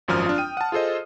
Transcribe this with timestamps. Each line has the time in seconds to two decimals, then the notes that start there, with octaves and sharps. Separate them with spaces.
0.08 G#1 F#2 F3 D#6 F6
0.26 D4 F4
0.38 G5 D#7
0.57 F#5 A5
0.72 F4 G#4 A4 C5 D#5